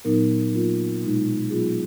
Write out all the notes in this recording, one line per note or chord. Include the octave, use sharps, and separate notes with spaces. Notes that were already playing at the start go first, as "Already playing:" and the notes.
A#2 F#3 B3 D#4 A#4
F#3 A#3 F4 A#4
B2 G#3 D#4
F#3 B3 F4 G#4